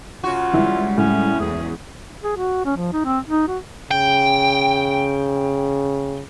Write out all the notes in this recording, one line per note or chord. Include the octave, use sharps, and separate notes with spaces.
C#3 F4 F#4
E3 G3 G#3 E4
A2 C#4
E2 G#4
G#4
F#4
C#4
F3
D#4
C4
D#4
F#4
C#3 G5